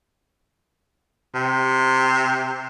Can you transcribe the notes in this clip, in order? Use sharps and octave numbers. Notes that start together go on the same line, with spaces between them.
C3